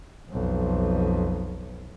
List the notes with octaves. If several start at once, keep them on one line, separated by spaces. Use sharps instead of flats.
B1 F2